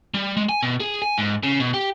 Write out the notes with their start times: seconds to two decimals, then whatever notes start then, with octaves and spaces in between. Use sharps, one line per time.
0.14 G3
0.37 G#3
0.49 G#5
0.63 B2
0.80 G#4
1.02 G#5
1.18 G#2
1.43 C#3
1.60 B2
1.74 G4